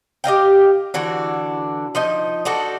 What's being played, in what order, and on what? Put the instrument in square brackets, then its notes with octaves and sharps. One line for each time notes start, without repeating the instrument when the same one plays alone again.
[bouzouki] G4 D#5 F5 G5
D3 E3 D4 F#4
F3 D#4 D#5
D4 D#4 F#4 A4